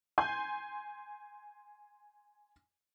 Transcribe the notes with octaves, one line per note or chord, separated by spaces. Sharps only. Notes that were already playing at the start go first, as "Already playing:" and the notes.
G#5 C6 G6